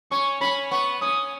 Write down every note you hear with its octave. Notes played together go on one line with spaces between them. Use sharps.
C#4 C#6
C#4 B5
B3 C#6
C#4 D#6